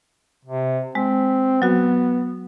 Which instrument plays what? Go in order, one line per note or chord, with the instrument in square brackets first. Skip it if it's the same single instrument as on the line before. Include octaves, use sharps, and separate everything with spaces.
[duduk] C3
[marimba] G#3 [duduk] C4
[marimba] F#3 F#4 [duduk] B3